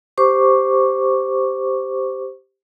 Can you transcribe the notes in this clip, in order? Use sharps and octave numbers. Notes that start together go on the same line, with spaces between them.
G4 C5 C#6 D6